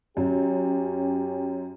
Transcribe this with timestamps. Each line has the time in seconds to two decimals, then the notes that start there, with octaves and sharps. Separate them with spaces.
0.17 F#2 C#4 G4